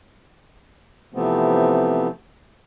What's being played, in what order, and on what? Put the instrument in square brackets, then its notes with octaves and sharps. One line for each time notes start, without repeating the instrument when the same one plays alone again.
[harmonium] C3 E3 F3 A3 B3 C4